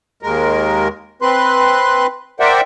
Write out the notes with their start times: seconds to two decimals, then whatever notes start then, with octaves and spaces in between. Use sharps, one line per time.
0.23 D#2 G#3 A#4
1.22 C4 B4 C6 F#6
2.40 A#4 C5 D5 E5 F#5 G5